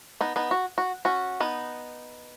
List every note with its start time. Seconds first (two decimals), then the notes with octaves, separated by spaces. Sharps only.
0.21 B3 D#4
0.36 B3 D#4
0.51 F#4
0.78 F#4
1.05 C#4 F#4
1.40 B3 D#4